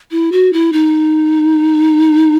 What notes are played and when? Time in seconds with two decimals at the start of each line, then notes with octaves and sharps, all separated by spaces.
0.11 E4
0.32 F#4
0.53 E4
0.73 D#4